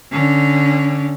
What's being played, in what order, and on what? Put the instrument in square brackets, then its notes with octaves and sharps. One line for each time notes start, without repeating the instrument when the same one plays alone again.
[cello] D3 C#4